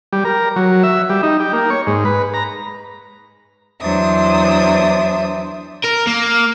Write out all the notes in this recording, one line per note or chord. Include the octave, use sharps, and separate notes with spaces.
G3
A#4
F#3
E5
G3
D#4
G4
A#3
C#5
G#2
B4
A#5
E2 F#3 D4 C5 E5 D#6
A#4
A#3